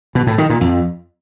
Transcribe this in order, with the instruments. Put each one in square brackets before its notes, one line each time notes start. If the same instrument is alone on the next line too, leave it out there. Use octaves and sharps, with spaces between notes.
[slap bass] B2
A2
D#3
A#2
F2